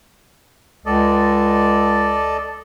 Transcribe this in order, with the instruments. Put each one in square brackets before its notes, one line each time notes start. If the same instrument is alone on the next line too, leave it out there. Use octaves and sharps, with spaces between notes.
[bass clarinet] C#2 [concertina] A4 D5 D#5